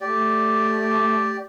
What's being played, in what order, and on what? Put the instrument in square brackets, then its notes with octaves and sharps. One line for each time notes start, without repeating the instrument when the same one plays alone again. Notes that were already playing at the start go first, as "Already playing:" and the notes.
[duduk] A3 [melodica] G4 D5